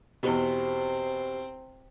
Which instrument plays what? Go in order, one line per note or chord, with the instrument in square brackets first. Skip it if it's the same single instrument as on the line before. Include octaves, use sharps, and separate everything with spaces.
[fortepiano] E2 B2 [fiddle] C4 [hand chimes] G4 C5